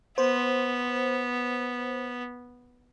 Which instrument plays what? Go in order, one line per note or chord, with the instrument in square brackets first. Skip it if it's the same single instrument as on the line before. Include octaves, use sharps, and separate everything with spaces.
[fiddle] B3 [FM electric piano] C5